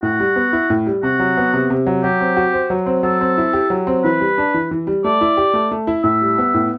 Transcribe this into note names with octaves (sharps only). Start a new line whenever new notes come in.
A2 F#4
G3
B3
E4
A2
G3
C3 F#4
F#3
B3
C3
C3
F#3
F#3 G4
C4
F#4
C5
F#3
C4
F#3 A4
C4
E4
G4
F#3
C4
E3 B4
G3
D4
E3
E3
G3
A3 D5
E4
G4
A3
A3
E4
A2 E5
G3
B3
A2